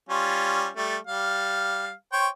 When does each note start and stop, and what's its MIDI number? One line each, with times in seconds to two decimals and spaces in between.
0.09 0.69 55
0.09 0.69 61
0.09 0.69 65
0.77 0.97 55
0.77 0.97 57
1.07 1.92 55
1.07 1.92 77
2.13 2.28 72
2.13 2.28 73
2.13 2.28 79